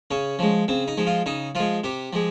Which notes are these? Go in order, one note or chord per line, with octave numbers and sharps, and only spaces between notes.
C#3 C#4
F3 G#3
C#3 C4
D#4
F3 G#3
F4
C#3 D#4
F3 G#3 F4
C3 G4
F3 G#3